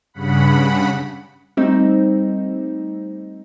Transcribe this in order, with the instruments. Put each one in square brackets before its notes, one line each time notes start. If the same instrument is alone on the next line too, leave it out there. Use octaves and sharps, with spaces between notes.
[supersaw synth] G2 C#3 F#5 B5
[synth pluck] G3 A3 C4 D#4